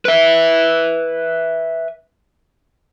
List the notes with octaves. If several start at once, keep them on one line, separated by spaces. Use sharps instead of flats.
B4 E5